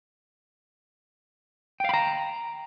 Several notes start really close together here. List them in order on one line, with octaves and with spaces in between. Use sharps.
G5 F5 B5 A#5